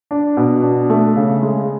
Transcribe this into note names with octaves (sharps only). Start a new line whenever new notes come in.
D4
B2
D4
A3
C#3
G#3